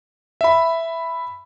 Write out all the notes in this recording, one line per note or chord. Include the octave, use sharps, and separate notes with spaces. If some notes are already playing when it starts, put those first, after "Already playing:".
E5 B5